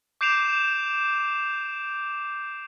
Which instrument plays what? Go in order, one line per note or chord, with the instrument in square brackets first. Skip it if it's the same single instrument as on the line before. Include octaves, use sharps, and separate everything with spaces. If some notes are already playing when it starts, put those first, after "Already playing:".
[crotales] D6 G6 C7 D7 E7 F7